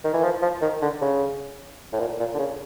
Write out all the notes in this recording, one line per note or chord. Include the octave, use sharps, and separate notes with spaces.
D#3
E3
F3
F3
D#3
D3
C#3
A2
A#2
A#2
D3
C#3